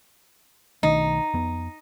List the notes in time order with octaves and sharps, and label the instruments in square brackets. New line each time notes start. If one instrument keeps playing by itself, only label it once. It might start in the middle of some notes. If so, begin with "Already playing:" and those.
[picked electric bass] B1 D#3 A3 [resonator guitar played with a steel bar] D#4
[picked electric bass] F2 B3